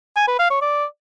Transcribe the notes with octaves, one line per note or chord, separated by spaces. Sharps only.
G#5
B4
F5
C#5
D5